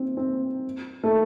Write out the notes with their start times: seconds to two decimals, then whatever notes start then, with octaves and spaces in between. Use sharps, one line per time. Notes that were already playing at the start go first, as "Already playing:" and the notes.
Already playing: C4
0.17 C4
1.04 A3